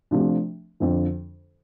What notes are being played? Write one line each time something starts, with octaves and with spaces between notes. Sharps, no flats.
C3 F3 A3 D4
F2 D3 F3